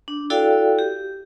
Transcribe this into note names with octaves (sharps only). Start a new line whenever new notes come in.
D4
E4 F#4 A4 D5 F5 G5
G4